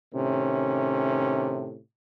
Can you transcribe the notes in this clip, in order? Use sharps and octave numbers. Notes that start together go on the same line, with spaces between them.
A2 C3 D#3 C#4